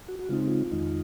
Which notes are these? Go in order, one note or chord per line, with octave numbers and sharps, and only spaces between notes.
F#4
F#4
C#3 G#3 C4 D#4 F4
F4
F2 D#3 G#3 D#4